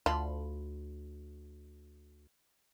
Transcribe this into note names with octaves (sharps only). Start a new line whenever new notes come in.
D2 F4 A5 B5 C6